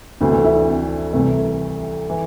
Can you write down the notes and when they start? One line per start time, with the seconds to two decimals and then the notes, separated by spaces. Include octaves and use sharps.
0.21 D2 C3 E3 C4
0.32 A3
0.44 E4
0.56 D4
0.68 C4
1.13 C2 C3 E3 A3
2.10 E3